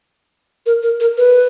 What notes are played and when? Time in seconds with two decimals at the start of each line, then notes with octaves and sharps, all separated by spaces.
0.66 A#4
0.83 A#4
1.00 A#4
1.17 B4